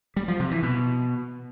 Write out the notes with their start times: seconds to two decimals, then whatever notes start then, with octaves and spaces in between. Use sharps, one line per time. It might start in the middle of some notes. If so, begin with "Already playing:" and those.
0.16 G3
0.28 F3
0.40 C3
0.51 E3
0.63 B2